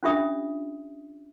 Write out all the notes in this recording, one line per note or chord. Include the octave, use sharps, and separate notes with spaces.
C#4 D4 F4 G4 E5 D#6